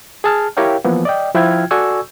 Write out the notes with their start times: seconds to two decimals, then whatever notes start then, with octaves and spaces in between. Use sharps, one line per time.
0.24 G#4 A5 F6
0.57 E4 G4 A#4 C#5 F5 G5
0.84 E3 F3 A#3 B3
1.05 D5 D#5 G5
1.34 F3 E4 F4 G5 F6 G#6
1.71 F#4 A4 D5 G#5 C#6 E6